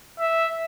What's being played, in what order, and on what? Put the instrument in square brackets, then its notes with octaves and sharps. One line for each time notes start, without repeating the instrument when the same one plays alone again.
[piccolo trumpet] E5